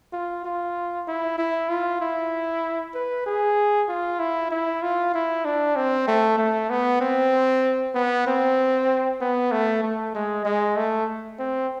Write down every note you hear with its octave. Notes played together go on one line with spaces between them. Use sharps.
F4
F4
E4
E4
F4
E4
B4
G#4
F4
E4
E4
F4
E4
D4
C4
A3
A3
B3
C4
B3
C4
B3
A3
A3
G#3
G#3
A3
C4